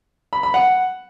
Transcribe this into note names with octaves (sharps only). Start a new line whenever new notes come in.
B5
B5
F#5